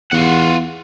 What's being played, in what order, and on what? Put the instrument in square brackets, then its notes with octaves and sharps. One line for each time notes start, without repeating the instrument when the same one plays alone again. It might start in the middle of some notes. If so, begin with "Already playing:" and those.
[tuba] E2 [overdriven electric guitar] F4 F#5